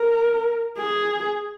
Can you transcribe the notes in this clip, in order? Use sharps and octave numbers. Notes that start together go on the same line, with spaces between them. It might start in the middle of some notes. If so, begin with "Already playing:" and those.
Already playing: A#4
G#4